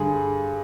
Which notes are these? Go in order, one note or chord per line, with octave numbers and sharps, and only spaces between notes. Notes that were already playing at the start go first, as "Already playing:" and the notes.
Already playing: G2 D3 G3 G#4